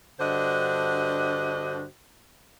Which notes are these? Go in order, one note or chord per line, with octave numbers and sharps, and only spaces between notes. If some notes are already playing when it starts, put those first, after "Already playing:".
G2 D3 D4 F#4 C5 D#5